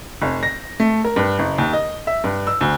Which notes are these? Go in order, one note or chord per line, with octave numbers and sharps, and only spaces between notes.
F1
A#6
A3
A#4
G2
F#1
D#2
D#5
E5
G2
E6
D2